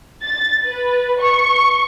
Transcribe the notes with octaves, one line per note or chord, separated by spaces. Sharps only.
A6
B4
C#6